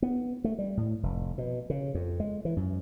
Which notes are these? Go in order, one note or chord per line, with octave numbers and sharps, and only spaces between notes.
B3
A3
G3
A2
F1
B2
C#3
F2
G#3
E3
F#2